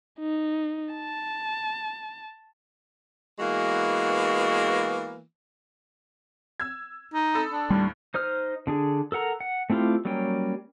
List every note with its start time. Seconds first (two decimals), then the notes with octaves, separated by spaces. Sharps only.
0.20 D#4
0.94 A5
3.39 E3 G#3 A#3 B3 F#4
6.60 E6 G#6
7.14 D#4
7.34 A4 B5 D#6
7.51 D4
7.70 D#2 A2 G3
8.14 D#4 C5 D#6 F6
8.67 D3 D4 G#4
9.12 A4 A#4 F#5 A#5
9.41 F#5
9.70 A3 C4 E4 F4 G4
10.05 F#3 G3 A#3 C#4 G5